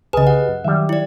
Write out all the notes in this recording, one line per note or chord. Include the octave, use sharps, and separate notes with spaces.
C2 C#3 G#4 B4 D#5
G4 F#5
F#2
D#3 F#3 G3 E5
E4 D5